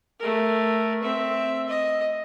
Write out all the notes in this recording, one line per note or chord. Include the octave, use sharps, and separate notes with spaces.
A3 A#4
C4 E5
D#5